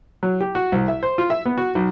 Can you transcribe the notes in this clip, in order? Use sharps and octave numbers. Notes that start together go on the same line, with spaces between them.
F#3
G4
F#4
C2
E5
C5
F4
E5
B3
F#4
B1